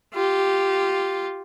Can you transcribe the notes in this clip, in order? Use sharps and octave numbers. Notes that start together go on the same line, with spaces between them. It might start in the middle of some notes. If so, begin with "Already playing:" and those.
F4 G4